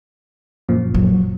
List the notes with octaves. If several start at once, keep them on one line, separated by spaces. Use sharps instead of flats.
F#2 A#2 F3
F#3